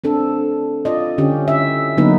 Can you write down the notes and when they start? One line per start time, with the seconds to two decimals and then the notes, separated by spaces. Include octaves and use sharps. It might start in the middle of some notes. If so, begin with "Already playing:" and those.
0.04 C4 D4 A4
0.85 F4 D5 D#5
1.18 D3 C#4 G4
1.48 E5
1.97 D3 F#3 A#3 B3 D#4 B4